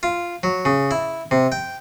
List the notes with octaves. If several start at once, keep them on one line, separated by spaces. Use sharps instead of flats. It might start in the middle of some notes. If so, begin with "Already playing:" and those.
F4
F#3
C#3
E4
C3
G5